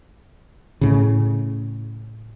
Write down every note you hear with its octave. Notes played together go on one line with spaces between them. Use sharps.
A2 C#3